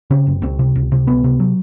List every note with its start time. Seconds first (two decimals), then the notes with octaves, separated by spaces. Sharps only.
0.10 C#3 C4
0.27 F#1
0.43 C#2 C4
0.59 C3
0.75 C#2
0.92 C3
1.07 C#2 B3
1.24 C3
1.40 F#3